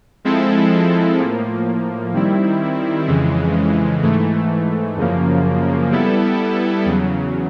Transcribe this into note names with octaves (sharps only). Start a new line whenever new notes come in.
F3 G#3 C4 E4 A4
A2 F3 A#3
D#3 G3 C4 E4
F2 C#3 E3 G#3
G#2 E3 A3
F#2 C#3 F3 A#3
G3 B3 E4 A4
E2 C#3 F#3